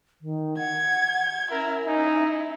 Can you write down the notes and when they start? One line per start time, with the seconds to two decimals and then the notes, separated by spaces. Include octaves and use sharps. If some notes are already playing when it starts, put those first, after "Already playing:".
0.22 D#3
0.58 F#5 G#6
1.51 C#4 E4 A#4
1.87 D#4 E4